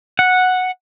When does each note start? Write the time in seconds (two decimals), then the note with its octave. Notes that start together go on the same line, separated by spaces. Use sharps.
0.19 F#5